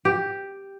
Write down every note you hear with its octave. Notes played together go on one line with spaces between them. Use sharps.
G4